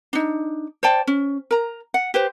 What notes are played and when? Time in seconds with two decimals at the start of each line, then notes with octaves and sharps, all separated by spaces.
0.13 D4 D#4
0.83 C5 D5 G5 A5
1.07 C#4
1.51 A#4 A#5
1.94 F#5
2.14 G4 B4 C5